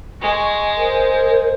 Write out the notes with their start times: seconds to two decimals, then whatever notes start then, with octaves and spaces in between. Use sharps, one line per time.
0.21 G#3 C#6
0.77 A#4 C5